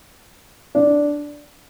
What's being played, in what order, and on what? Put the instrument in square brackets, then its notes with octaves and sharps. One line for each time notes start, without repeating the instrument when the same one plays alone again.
[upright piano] D4